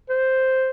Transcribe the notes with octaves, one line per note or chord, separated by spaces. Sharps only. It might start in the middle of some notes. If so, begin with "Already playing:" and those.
C5